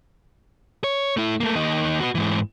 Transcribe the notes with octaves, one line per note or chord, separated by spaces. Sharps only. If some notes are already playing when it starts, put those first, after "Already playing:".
C#5
A3 E4
A3 A#3
D#2 D#4
B3 F#4
G#2 E3